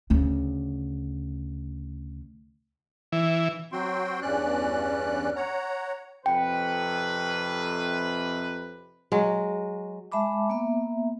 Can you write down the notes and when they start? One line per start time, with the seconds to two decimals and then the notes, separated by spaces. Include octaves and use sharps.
0.10 D2 C#3
3.12 E3
3.72 F#3 C4 F#4 G5 C6
4.22 E2 G2 C#4 D5 F#6
5.36 C#5 F#5 A#5
6.26 F2 C3 B4 G5
9.12 F#3 G#3
10.12 G#3 E5 A5 B5 D6
10.50 A#3 B3 E5